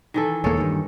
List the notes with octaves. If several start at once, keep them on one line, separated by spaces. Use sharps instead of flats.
D#3 E3 A4
E1 G#3 A#3 A4 C#5
G2 D#3